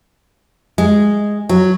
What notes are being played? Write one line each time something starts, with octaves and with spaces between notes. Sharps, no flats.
G#3
F#3